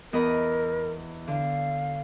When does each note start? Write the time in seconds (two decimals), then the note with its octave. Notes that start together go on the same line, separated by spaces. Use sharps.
0.13 E2 A#4 D#5 B5
1.28 D3 F5